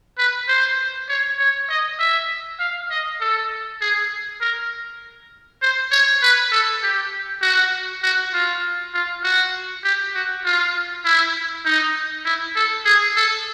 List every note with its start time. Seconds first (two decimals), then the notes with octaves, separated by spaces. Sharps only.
0.18 B4
0.48 C5
1.09 C#5
1.39 C#5
1.69 D#5
1.99 E5
2.60 F5
2.91 D#5
3.20 A4
3.81 G#4
4.41 A#4
5.62 C5
5.92 C#5
6.22 B4
6.52 A4
6.83 G4
7.42 F#4
8.03 F#4
8.33 F4
8.94 F4
9.24 F#4
9.84 G4
10.15 F#4
10.45 F4
11.05 E4
11.65 D#4
12.25 E4
12.56 A4
12.85 G#4
13.16 A4